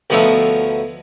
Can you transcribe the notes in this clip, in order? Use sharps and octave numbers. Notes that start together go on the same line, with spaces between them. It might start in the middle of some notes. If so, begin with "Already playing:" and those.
D2 F3 B3 D#4 C#5 E5